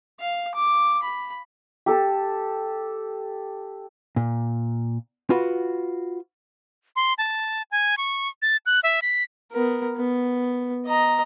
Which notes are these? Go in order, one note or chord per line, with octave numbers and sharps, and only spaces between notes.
F5
D6
B5
G4 A4 A5
A#2
F4 F#4 B4
C6
A5
G#5
C#6
A6
F#6
E5
B6
B3 A#4
B3
D#5 A#5